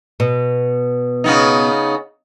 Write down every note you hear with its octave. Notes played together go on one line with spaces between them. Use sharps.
B2
C#3 B3 D#4